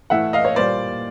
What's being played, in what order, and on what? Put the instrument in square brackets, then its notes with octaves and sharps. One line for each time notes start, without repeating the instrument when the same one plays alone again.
[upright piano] A2 E3 A3 E5 F#5
D#5 F5
C#5
A#2 G3 A#3 C5 D5